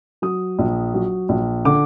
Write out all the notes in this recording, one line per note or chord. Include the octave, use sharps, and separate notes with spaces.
F#3 D#6
A#1
F#3
A#1
D3 D6